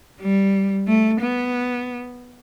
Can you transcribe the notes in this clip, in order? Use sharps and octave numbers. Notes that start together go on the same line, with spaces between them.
G3
A3
B3